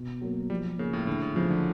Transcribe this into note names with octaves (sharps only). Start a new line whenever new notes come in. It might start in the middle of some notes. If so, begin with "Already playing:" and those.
Already playing: B2
F#3 A#3
F3 G3
C#3 A#3 C#4
A2
A2 D3
A2
C#3 F3 A3
D3